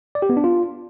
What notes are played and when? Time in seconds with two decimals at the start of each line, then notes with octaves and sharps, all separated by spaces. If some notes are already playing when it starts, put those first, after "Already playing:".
0.15 D5
0.22 G4
0.30 B3
0.37 D4
0.44 F4